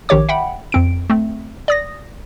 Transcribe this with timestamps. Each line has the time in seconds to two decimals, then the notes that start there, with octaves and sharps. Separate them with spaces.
0.09 A#1 D#3 G4 C#5 D6
0.29 E5 F#5 G5 B5
0.72 F2 C4 D7
1.10 A3 C4
1.68 D5 D#6 A#6